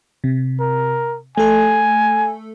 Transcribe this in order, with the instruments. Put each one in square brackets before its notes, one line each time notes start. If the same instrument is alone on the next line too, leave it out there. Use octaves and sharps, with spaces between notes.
[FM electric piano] C3
[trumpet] A#4
[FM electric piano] A3 A4 [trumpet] G#5